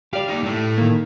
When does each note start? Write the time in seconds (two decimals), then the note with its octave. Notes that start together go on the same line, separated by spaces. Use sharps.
0.13 G4 D5 F5
0.28 A#3 D#4
0.43 A2 A3
0.78 D#3 A#3